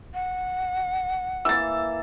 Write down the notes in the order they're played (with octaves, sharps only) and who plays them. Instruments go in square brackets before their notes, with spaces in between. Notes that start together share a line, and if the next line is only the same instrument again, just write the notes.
[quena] F#5
[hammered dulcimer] E3 A#3 [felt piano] E6 A6